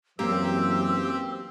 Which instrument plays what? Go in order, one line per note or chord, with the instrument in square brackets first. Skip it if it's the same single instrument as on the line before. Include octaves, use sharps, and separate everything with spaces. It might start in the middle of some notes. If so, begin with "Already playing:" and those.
[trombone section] F#2 E3 [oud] A#3 [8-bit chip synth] C4 G4 [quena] E6